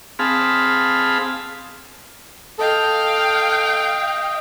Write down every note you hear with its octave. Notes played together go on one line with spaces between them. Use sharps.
C4 G#4 F5 A5 B5
A4 D#5 F5 G5